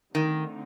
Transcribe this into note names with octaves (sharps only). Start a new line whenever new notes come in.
D3 D#3 A3 C4 D#4